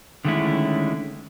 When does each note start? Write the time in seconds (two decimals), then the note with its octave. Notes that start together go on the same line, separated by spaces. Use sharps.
0.25 D3 D#3 G#3 A3 C#4 E4